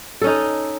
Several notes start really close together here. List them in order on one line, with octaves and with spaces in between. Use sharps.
A4 C#4 D#4